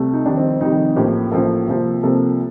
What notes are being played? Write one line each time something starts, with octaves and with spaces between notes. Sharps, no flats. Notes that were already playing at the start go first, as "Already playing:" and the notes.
Already playing: C2 C3 A3
D#4
F1 F2 D#3 G3 D4
C4
C4
F1 F2 D#3 G3 D#4
A1 A2 F3 A#3 G4
A1 A2 F3 A#3 A4
C2 C3 F3 A#3
C2 C3 F3 A#3 A4